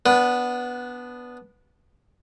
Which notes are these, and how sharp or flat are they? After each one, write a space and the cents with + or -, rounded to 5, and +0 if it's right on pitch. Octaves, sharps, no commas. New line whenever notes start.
B3 +0 D4 -15 B4 +0